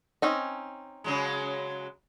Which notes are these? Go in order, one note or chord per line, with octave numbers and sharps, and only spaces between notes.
C4 C#4 D#4
C#3 F#3 G#3